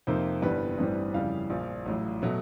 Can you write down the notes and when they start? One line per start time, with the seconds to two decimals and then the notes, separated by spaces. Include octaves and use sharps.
0.07 F2 C3 F3 A#3 D#4 C5
0.42 G1 G2 E3 G3 B3 B4
0.78 A1 G2 E3 G3 C4
1.14 F2 C#3 E3 G3 F5
1.50 A#1 A#2 F3
1.86 A1 A2 F#3
2.22 B2 F#3 A3